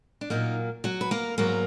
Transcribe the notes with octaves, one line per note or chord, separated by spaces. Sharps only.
D4
A#2 F#3 A#3 D#4
F#3 F#4
B4
A#3 A#4
G#2 F#3 A#3 B3 A#4